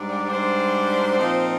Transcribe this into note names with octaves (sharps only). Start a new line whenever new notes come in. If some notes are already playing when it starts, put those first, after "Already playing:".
Already playing: G#2 G3 D4
D5
G#2 G3 D4 C5
A#2 F3 C4 D#4